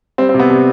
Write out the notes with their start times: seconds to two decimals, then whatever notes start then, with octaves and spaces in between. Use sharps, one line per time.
0.18 G3 C4
0.29 C4
0.34 C3
0.39 B3
0.50 C3